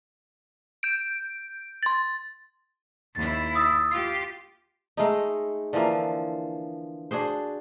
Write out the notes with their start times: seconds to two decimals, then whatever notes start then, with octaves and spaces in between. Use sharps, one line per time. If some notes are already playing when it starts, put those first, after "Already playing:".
0.83 G6 D7
1.83 C6 A6
3.15 D#2 E4 A6
3.55 D#6 E6 A6
3.91 F4 G4 C7
4.97 G#3 A3 D#4
5.73 D3 E3 F3 A#3
7.11 D4 F#4 G#4 C5